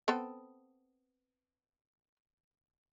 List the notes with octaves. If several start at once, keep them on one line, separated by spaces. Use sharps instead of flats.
B3 C4 A4